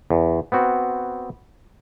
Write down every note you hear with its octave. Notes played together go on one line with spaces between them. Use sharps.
E2
B3 C4 F#4